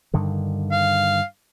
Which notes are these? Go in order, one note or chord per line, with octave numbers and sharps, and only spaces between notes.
G2 D3 D#3
F5